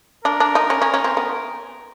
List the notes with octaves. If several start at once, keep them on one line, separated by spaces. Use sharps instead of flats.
D4 A#4
D4
D#4
C#4
C#4
C#4
C4
B3